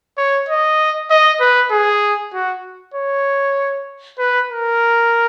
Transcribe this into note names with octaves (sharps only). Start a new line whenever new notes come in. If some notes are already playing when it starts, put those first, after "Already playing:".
C#5
D#5
D#5
B4
G#4
F#4
C#5
B4
A#4